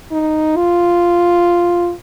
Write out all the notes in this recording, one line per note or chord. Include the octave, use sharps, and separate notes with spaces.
D#4
F4